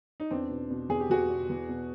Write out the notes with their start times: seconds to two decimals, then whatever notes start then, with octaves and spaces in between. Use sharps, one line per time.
0.20 D#4
0.31 E2 C4 D4
0.50 B2
0.70 B2
0.89 E2 G#4
1.00 G4
1.10 E2 F#4 G#4
1.30 B2
1.49 E2
1.69 B2